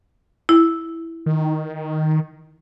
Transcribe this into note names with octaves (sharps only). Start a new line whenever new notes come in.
E4
D#3